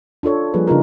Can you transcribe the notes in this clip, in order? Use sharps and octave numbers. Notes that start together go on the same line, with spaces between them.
D4 F4 A4 C#5
F3 G3 A#3 G#4 B4
C#3 D4 D#4 F4 G#4 A#4